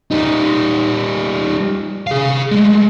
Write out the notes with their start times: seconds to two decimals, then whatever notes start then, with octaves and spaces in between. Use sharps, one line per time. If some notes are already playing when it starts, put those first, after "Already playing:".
0.11 G3 D#4
2.07 G#4 F5
2.51 G#3 A3